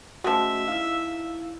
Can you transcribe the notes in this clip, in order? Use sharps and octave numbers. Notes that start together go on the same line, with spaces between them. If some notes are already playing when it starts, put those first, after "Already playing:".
F3 G#3 A3 C#4 F#4 E5 E6
D#4 E4 F5 E6